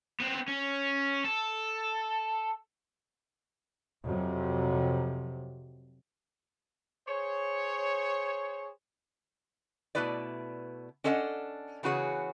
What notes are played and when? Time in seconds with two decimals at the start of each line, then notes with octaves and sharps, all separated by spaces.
0.20 B3 C4
0.48 C#4
1.25 A4
4.05 F2 C3 F#3
7.07 G#4 C5 C#5
9.95 B2 A3 C4 E4 B4 D5
11.04 C#4 D4 A4 D#5 F5 F#5
11.83 C#3 E3 B3 F#4 G#4 C#5